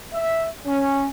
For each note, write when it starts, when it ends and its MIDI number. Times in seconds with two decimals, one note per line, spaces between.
0.13 0.46 76
0.66 1.07 61